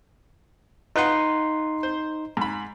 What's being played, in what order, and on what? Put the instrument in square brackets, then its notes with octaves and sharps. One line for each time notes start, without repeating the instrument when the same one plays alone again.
[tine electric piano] D#4 C6 [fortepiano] F4 B4 F#5
[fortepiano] C5
G#2 B5